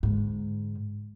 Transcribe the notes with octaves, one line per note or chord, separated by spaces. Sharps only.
G#2 D3